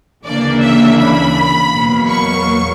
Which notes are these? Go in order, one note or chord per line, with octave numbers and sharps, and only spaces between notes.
D2 C#3 E3 A#3 D4 D5
E5
B5
E2 B2 F#3 A#3
C#6